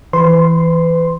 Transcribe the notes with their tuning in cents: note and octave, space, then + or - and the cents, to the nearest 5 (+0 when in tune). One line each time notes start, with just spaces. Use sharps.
E3 +0 B4 +35 C6 +0